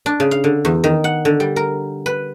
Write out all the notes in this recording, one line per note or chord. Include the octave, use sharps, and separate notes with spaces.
D4
C#3
F5
D3
E2
D#3
F#5
D3
G3
A#4
B4